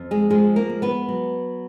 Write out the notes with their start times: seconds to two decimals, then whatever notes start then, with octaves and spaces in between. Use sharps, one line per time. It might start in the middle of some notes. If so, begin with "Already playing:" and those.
Already playing: F2
0.11 G#3 G#4
0.30 F3 G#3 G#4
0.56 A#3 A#4
0.70 G#3
0.82 B3 B4
1.08 F#3